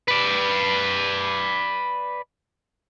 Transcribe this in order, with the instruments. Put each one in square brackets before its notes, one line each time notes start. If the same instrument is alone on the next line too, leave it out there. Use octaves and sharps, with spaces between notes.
[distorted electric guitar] B4 D5